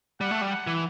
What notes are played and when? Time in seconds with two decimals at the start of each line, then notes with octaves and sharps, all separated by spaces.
0.21 G3 F#5
0.31 A3
0.41 G3
0.52 F#5
0.67 E3